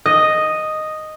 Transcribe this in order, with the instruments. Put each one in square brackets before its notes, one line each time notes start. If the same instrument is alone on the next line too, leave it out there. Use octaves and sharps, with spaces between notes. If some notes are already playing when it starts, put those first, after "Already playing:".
[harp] D#5